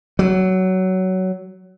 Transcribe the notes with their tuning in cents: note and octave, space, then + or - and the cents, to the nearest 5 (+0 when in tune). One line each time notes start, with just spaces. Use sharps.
F#3 +15